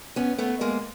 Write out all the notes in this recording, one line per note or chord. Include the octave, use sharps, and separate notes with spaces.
B3 C#4
A3 B3
G#3 A#3